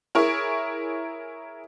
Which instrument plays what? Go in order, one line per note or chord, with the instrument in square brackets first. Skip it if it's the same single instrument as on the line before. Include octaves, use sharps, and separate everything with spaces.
[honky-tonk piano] E4 G#4 A#4 C#5